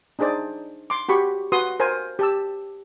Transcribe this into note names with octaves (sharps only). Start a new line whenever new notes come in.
D4 D#4 G#4 C5 D5
C6 D6
F#4 G4 B5 C#6
F#4 B4 C6 D#6
A#4 C5 G#5
G4 A5 E6